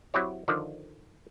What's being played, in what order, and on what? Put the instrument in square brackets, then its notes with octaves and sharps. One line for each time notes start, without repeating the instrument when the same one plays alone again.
[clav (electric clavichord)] F#3 C4 E4 G4 C#5
D3 D#3 F3